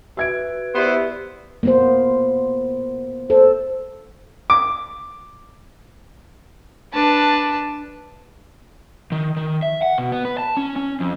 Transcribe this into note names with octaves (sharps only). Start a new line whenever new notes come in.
F#4 B4 E5 G#6 D7
B3 E4 G4 C5 D5
A#3 B3 C5
A4 C5
D6
D4 B4 A5
D#3
D#3
E5
F#5
B2
B3
B4
A5
C#4
C#4
F2